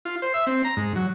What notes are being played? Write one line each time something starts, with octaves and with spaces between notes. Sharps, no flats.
F4
C5
E5
C4
A#5
G#2
F#3